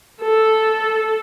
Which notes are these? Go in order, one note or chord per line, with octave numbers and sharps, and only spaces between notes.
A4